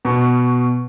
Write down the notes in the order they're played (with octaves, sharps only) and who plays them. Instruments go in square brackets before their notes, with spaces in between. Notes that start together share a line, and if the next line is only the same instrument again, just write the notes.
[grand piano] B2 C#6